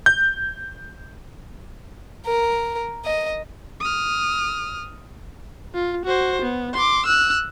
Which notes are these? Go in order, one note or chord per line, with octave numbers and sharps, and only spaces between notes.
G6
A#4
D#5
D#6 F6
F4
F#4 C5
B3
C6 D6
E6 F#6